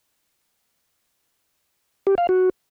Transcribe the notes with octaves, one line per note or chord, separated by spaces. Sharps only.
G4
F5
F#4